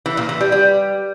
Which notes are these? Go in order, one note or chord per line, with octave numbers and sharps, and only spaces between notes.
E3
A#2
E3
G3
G3